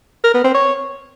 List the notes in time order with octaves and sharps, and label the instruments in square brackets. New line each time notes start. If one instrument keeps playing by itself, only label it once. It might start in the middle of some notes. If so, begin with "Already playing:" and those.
[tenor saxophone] A#4
B3
C4
C#5